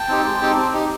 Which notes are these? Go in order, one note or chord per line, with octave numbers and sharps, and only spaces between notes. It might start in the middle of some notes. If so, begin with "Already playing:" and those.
Already playing: G5 A5
C4 D#4 G4
G#3
C4 D#4 G4
C4
D#4 G4